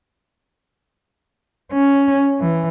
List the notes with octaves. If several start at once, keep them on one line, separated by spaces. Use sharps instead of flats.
C#4
E3